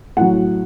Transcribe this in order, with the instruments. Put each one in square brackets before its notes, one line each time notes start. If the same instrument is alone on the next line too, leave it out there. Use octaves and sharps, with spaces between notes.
[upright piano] A2 F#3 F#5